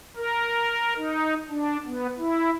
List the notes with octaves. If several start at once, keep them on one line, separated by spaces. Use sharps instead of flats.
A#4
D#4
D4
B3
E4